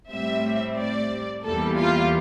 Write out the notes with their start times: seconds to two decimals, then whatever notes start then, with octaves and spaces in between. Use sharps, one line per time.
0.11 A2 G3 C4 E5
0.78 D5
1.45 E2 E3 G3 A#3 A4
1.79 F4